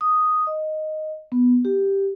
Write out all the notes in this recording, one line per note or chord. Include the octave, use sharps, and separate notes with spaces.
D#6
D#5
B3
G4